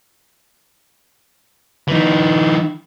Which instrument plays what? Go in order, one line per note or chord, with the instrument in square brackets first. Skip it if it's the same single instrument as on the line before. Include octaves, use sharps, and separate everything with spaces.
[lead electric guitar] E3 D#4